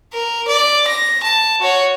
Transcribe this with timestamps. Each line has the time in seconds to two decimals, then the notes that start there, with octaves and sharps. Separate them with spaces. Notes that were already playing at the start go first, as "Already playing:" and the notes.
0.12 A#4
0.48 D5
0.87 A#6
1.23 A5
1.61 F#4 C#5